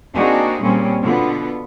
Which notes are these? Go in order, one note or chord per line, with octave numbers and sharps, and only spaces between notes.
A#3 C4 D4 D#4 F#4 G#4
A#2 G3 A#3 C4 C#4
B2 D3 B3 F4